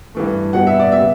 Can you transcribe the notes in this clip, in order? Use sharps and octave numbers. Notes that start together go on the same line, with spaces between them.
G2 E3 A3
B2 G3 B3 F#5
E5
D5
C#3 G3 B3 E5